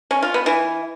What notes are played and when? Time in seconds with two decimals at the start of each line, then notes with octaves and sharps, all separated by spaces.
0.11 C#4
0.22 F4
0.34 B3
0.46 E3